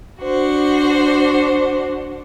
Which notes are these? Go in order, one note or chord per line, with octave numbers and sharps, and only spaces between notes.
D4 F#4 C5